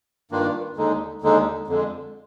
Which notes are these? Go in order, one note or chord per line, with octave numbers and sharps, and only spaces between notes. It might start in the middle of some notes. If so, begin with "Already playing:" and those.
G2 D#3 A#3 D4 F4
D#2 D3 G#3 D#4
D#2 D3 G#3 D#4
F2 D3 G#3